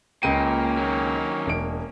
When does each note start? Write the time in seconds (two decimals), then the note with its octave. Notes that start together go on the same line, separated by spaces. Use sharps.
0.23 C#2 A#2 A#3 C#4 G5 D#7
0.77 D#2 F#3
1.47 E1 D7